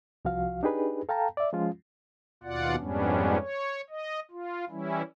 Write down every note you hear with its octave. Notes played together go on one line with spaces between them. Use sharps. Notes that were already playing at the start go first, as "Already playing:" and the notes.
C2 F3 F#4 F5
D4 D#4 G4 G#4 B4
A4 F5 G5 A5 A#5
D5 E5
F3 G#3 C#4 F4
D#2 B2 F4 D5 F#5
F2 G#2 G3 B3 C#4 D4
C#5
D#5
F4
E3 G3 C#4 E4